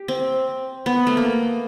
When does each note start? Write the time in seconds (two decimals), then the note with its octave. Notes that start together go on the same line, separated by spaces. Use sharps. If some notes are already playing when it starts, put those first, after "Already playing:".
Already playing: G4
0.08 C4
0.86 B3
1.07 A3
1.17 A#3